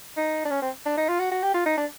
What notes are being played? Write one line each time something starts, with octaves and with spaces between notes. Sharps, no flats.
D#4
D4
C#4
C4
D4
D#4
F4
F#4
F#4
G4
F4
D#4
D4